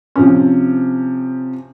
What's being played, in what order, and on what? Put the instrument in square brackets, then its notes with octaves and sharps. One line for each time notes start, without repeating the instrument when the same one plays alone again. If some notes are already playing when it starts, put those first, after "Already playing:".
[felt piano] C3 F3 C#4